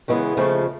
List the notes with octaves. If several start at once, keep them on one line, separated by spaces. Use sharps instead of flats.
C#3 E3 G#3 B3 E4
D#2 C#3 F3 A3